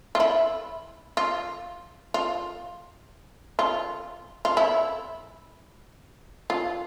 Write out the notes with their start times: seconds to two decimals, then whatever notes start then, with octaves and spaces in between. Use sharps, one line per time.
0.15 F4
0.20 E4
1.17 F4
2.14 F4
3.59 F4
4.45 F4
4.57 E4
6.50 F4